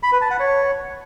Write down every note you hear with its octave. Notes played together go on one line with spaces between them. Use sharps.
B5
B4
A5
F#5
C#5